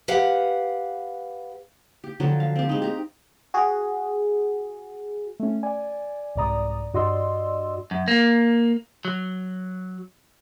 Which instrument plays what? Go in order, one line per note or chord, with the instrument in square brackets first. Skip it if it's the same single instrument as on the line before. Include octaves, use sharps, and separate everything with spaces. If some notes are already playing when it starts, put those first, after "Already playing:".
[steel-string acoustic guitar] G4 B4 F5 F#5
[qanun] G4
D3 F3 F#3
F5
C4 G4
G#3 D#4
G4 A#5
[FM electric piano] F#4 G#4
[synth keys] A3 C#4
D5 G#5
C2 G#2 D5 A#5 D#6
G2 F#4 D5 D#5 C6 E6
[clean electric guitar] F#2
A#3
F#3